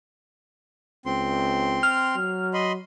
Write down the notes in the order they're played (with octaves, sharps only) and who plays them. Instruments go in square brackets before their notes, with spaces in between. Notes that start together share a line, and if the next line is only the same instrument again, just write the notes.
[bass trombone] C#2 [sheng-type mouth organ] C4 C6
[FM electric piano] F6
[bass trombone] F#3
[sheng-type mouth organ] D#5 B5 C6